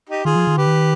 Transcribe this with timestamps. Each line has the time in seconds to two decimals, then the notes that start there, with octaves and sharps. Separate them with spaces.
0.10 D#4 G4
0.25 D#3 F4 G#4
0.36 F3
0.47 D#3
0.57 D3 G4 B4
0.67 D#3